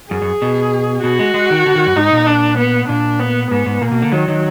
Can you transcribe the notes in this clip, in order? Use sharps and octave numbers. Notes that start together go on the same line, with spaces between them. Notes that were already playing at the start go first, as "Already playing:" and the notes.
F#2 G#4
F#2
B2
B2 F#4
G#3
G#3
D#3
D3
D#3
F#2
G#2 D#4
A#2
D4
B3
A#2 D4
B3
G#2 B3
G#2
A#2 A#3
B2
D3
D#3 F#3
D#3